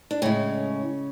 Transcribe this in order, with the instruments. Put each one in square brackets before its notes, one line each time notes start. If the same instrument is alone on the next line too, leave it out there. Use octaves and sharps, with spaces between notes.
[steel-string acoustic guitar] D4
A2 C#3 G#3 C#4